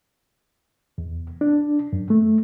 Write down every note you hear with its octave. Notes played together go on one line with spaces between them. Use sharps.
E2
D4
F#2
A3